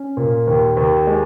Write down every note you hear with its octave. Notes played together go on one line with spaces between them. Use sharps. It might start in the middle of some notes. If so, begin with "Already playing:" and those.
Already playing: C#4
A#2
D#2
D#2
G#3